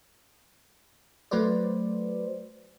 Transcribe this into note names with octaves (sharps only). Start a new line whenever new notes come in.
F#3 A3 F#4 B4 C5 D5